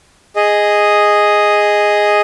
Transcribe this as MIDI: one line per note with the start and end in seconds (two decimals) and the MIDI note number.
0.36 2.21 68
0.36 2.21 75